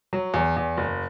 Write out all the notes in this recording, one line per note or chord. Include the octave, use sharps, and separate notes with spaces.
F#3
E2
E2
F#1